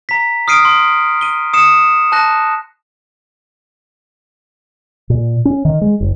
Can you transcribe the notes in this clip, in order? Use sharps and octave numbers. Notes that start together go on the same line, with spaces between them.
A#5 B6
D#6 F6 C7 D7 D#7
C6
D#7 G7
D#6 C7 C#7 E7
A5 F#6 A#6
A#2
C#4
D#3
G#3
F#1